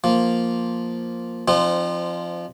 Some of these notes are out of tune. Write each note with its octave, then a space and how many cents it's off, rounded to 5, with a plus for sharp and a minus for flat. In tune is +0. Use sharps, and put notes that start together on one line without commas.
F3 +0 A#3 +0
F3 -15 C4 +0 D#4 -45